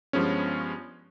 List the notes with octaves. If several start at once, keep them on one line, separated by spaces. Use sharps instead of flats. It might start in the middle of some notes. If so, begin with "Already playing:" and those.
G2 F3 G#3 B3 C#4